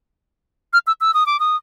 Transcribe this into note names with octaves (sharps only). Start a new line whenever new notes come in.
F6
E6
E6
D#6
D6
D#6